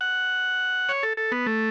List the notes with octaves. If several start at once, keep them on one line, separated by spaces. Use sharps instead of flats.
F#5
C#5
A4
A4
B3
A3